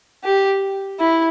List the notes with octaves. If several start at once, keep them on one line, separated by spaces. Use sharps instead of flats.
G4
E4